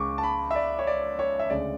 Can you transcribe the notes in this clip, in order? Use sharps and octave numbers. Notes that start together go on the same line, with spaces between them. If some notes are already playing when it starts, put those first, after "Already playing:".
Already playing: C#2 C#3 G#3 C#6 D6
A5
B5
E5
D5
C#5
D5
C#5
E5
D2 C#3 G#3 D5